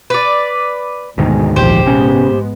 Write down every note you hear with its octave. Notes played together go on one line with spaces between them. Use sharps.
B4 D5
D2 G#2 B2 D#3 G#3
A#1 E2 F3 G4 C5
G#2 C3 G#3 B3 C#4